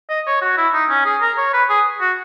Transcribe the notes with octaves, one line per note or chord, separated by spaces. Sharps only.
D#5
C#5
F#4
E4
D#4
C#4
G#4
A#4
C#5
B4
G#4
F#4